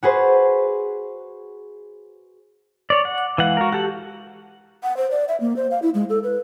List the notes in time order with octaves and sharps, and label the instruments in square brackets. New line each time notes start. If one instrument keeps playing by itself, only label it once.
[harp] F#4 G#4 B4 C5
[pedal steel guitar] C#5 D5
F#5
[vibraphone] D6
[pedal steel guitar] E3 F#5 [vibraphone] G#3 F5
[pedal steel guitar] F#4 A#4
[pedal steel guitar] F#4 A4 F#5 [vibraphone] G4
[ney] F#5
C5
D5
E5
A#3
C5
F5
E4
G#3
A4
B4